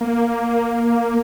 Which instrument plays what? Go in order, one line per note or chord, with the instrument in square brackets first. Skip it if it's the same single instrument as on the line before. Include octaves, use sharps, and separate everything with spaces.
[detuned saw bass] A#3